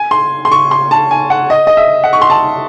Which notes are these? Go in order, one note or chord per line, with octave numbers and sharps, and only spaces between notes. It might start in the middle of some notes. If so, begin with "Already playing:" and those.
Already playing: G#5
C6
C6
C#6
C6
A5
G#5
F#5
D#5
D#5
E5
F#5
C#6
C6
A5